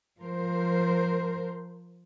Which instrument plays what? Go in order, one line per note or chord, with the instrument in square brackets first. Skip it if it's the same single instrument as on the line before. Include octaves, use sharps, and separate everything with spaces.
[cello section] F3 A#4 C5